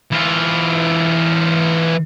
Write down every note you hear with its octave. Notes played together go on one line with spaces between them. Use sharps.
E3 F4